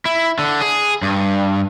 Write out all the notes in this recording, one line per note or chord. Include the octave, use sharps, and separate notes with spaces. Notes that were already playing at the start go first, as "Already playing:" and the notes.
E4
D3
G#4
G2